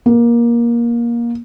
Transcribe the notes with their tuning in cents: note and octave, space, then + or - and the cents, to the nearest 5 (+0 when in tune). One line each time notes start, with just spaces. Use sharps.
A#3 +20